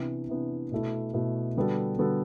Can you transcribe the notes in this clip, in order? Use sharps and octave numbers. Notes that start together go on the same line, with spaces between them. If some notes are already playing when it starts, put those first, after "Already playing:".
Already playing: C3 E3 B3 D4
C3 E3 B3 D4
B2 A3 E4
B2 A3 E4
D3 G3 B3 F#4 A4
D3 G3 B3 F#4 A4